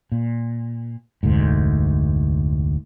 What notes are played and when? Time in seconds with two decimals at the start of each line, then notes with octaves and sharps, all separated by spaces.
0.12 A#2
1.23 F1 D2 G#2